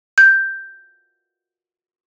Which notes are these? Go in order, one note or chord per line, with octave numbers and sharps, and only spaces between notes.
G6